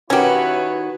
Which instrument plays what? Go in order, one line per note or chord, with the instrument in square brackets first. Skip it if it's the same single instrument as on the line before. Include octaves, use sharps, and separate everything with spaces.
[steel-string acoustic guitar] D#3 F#4 [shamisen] C#4 G4 [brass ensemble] E4 B4 C#5